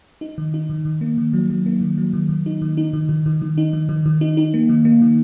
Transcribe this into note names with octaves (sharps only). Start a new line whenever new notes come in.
D#4
D#3
D#4
D#3
D#3
A#3
D#3
F#3
F#3
A#3
D#3
F#3
D#3
D#3
D#4
D#3
D#4
D#3
D#3
D#3
D#3
D#4
D#3
D#3
D#3
D#4
D#4
A#3
D#3
A#3
D#3